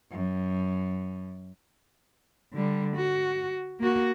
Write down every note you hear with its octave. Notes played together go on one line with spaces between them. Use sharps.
F#2
D3 G3
F#4
A#3 F#4